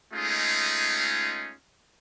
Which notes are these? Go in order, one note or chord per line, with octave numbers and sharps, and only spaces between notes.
G#3 A3 C#4 D#4 F4 G#4